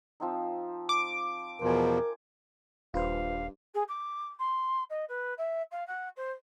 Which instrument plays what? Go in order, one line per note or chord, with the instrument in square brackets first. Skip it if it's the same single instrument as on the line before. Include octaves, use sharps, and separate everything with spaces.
[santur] F3 C4 D#4
[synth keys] D6
[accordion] E2 B2 F3 [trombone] A#4 [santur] C5 G#5
[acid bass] D#1 [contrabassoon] G2 [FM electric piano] F4 B4 C5 [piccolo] F5
[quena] G#4
D6
C6
D#5
B4
E5
F5
F#5
C5